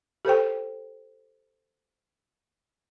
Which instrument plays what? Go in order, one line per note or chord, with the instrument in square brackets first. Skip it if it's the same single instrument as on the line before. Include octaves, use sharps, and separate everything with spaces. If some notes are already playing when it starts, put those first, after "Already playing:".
[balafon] G4 A4 C5 G5